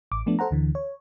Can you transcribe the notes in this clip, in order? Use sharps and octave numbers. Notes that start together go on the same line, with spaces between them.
A1 D6
F3 A3 B3 D4
A4 C5 F#5 A#5
D2 D3 E3
C#5